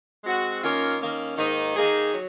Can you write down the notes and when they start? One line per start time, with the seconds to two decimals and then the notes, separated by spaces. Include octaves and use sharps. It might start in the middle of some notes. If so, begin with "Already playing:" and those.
0.24 G#3 C4 F#4
0.62 D#3 A#3 C#4 F4 A#4
1.00 D#3 A#3 C#4
1.37 G#2 D#3 A#3 D#4
1.76 D#3 A#3 D#4 G#4
2.14 F#3